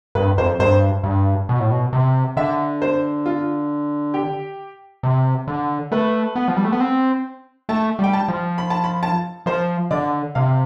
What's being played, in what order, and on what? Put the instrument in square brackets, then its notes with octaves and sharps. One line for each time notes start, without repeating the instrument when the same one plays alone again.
[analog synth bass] G2 [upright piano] B4
[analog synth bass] F2 [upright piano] C5
[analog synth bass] G2 [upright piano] C5
[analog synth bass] G2
B2
A2
B2
C3
[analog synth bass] D3 [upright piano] E5
[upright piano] C5
F4
G4
[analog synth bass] C3
D3
[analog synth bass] A3 [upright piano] B4
[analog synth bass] B3
F3
G3
A3
B3
C4
[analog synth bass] A3 [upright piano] A5
[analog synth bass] G3 [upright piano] G5
[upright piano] A5
[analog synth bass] F3
[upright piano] B5
A5
B5
A5
[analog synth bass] F3 [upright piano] C5
[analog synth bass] D3 [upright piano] D5
[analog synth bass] C3 [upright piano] F5